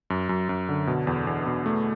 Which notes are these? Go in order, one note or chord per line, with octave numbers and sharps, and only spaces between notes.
F#2
F#2
F#2
D3
B2
E2
E2
B2
A3